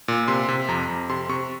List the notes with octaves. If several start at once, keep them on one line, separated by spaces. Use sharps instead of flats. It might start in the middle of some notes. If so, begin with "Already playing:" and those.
A#2
C3 C6
C3
F2 A#5
F2
C3 C6
C3 C#6